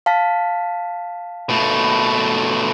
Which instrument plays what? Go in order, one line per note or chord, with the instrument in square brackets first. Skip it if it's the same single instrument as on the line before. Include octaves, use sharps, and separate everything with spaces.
[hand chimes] F5 A5 B6
[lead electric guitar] B2 A3